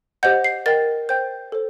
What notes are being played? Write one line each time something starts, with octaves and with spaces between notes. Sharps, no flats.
G4 C5 D#5 F#5 G6
C7
A#4 D#5 G5 A6
C5 G5 G6
A4 C5